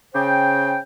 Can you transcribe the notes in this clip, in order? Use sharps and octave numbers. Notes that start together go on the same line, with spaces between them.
C#3 C5 G5